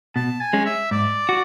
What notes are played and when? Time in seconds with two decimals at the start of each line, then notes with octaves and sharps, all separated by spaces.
0.16 B2 A5
0.41 G#5
0.53 G#3 C#4
0.66 E5
0.91 G#2 D5
1.29 F#4